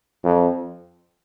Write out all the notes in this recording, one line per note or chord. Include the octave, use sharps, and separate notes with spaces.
F2